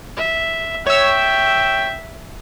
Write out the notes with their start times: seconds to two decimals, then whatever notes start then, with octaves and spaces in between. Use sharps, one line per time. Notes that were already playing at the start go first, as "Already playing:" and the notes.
0.17 E5
0.87 C#5 E5 G5 E6